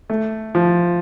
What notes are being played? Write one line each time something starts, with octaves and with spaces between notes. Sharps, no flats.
A3
F3